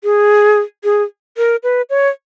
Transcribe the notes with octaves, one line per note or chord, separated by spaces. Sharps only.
G#4
G#4
A#4
B4
C#5